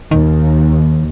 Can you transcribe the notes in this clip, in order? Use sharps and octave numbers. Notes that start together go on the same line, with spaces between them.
D#2 D#3